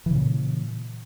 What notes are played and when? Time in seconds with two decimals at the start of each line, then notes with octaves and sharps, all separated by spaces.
0.06 E3
0.11 C#3
0.15 A#2